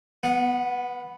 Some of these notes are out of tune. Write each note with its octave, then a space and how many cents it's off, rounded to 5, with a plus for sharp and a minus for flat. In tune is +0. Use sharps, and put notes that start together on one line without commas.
B3 +0 F#5 -40